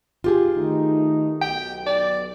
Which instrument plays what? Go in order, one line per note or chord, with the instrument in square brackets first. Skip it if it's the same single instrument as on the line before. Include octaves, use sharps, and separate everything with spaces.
[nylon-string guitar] F4 G4 G#4
[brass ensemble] D#3 A3 D#4
[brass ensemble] B1 [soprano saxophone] G5
[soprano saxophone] D5